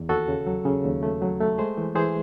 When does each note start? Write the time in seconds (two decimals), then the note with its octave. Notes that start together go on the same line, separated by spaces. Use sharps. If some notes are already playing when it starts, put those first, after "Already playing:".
Already playing: E2
0.09 D#2 F#4 A4
0.28 C#3
0.46 F#3
0.65 C#3
0.84 D#2
1.03 A3
1.22 F#3
1.40 A3
1.58 G#3 G#4 C5
1.77 E3
1.95 E3 G#4 C5